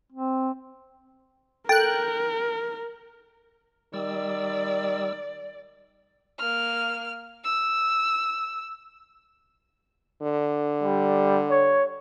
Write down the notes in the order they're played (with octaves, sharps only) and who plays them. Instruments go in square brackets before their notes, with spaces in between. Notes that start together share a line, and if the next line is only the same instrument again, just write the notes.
[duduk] C4
[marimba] A4 [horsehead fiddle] A#4 [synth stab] G5 F#6
[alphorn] D#3 [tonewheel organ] G3 E6 [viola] D5
[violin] A#3 F6
E6
[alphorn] D3
[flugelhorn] G3
C#5